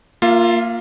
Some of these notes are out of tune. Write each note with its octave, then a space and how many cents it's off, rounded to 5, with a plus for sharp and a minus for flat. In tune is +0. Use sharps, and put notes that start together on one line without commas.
A#3 +0 F4 +0 E5 +40